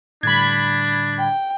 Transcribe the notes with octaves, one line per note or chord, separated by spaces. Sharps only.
A2 D3 G3 D4 B5 G#6
G5